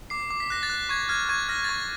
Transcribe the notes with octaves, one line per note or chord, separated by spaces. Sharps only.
D6 C7
D6
B6
F#6 A#6
A6
F#6
C#6 G#6
F6 G#6
C#6 G#6
F6 A#6
A6
C#6 G#6